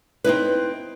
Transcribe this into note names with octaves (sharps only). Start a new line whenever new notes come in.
C4 D#4 E4 B4